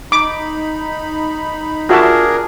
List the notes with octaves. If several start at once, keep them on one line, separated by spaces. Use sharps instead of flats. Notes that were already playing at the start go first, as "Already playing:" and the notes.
D#4 B5 D6
D4 F4 F#4 G#4 A#4 E5 A5